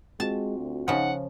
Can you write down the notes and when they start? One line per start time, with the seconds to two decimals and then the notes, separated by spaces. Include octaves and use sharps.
0.20 G#3 C4 F4 F#4 A5
0.58 D2
0.88 C#3 F3 D#4 F#5